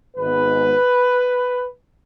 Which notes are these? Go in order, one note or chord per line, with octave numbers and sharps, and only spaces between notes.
G#1 G#2 G#3 B3 B4